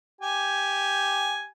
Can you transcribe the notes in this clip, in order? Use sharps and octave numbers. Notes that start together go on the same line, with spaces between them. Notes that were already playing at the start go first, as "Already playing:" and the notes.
G4 G#5